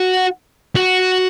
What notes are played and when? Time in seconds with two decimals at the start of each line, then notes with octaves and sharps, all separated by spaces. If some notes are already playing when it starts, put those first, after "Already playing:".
Already playing: F#4
0.76 F#4